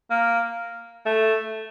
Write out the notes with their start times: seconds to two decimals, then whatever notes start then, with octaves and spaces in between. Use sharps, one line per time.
0.11 A#3
1.06 A3